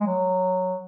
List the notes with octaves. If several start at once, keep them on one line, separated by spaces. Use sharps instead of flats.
G#3
F#3